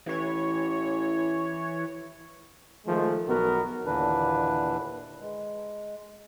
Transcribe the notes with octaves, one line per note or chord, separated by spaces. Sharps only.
A1 E3 C#5
D#3 F3 G#3 A3
B1 B3 F#4 A#4
D#2 A#2 D3 E3 D4 B4
G#3